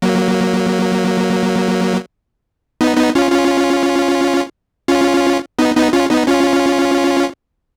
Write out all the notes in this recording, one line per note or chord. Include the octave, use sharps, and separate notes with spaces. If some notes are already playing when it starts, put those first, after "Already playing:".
F#3 A#3
B3 D#4
B3 D#4
C#4 F4
C#4 F4
C#4 F4
B3 D#4
B3 D#4
C#4 F4
B3 D#4
C#4 F4